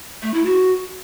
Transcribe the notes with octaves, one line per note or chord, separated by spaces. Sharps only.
A3
E4
F#4